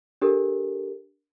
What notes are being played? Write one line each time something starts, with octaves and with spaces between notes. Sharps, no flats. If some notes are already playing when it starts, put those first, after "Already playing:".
D4 G4 A4 A#4